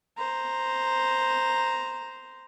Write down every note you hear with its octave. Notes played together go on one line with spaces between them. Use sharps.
C5 A#5